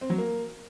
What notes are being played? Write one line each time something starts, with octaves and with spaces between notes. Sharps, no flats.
C4
F#3
A#3